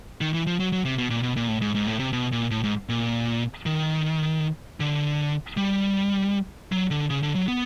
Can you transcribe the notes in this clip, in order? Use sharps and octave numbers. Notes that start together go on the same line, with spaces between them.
D#3
E3
F3
F#3
F#3
C3
B2
A#2
B2
A#2
A2
G#2
G#2
A2
C3
B2
A#2
A2
G#2
A#2
D#3
D3
G3
F#3
D3
C#3
D3
F#3
B3